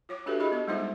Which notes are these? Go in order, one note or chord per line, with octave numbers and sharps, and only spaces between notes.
F4 C#5 D6
D4 F#4 G4 A4 B4 E5
E4 G4 G#4 D#5 B5
B3 D#5
G3 G#3 D#4 F4 C5 E5